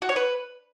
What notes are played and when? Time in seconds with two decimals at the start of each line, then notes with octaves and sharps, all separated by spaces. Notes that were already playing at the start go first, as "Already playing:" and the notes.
0.02 F#4
0.09 C#5
0.16 B4